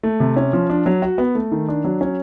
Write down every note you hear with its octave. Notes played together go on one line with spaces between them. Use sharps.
A3
C3
C#4
F3
D4
F#3
F#4
B3
A3
D#3
D4
F#3
C#4